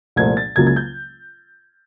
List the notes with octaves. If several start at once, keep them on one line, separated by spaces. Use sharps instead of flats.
C2 A#2 F3 A3 G#6
A6
C#2 C#3 F#3 A#3 G#6
G#6
G6